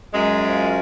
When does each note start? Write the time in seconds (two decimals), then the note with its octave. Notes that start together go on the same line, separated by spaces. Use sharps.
0.13 F#2 G#3
0.44 F3